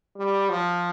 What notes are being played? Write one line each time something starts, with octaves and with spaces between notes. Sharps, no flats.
G3
F3